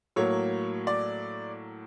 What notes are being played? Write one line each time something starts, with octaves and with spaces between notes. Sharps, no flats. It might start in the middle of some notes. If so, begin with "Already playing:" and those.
A2 F#3 A#3 C#5
D5